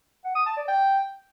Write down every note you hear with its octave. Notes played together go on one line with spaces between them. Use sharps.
F#5
D#6
A5
D5
G5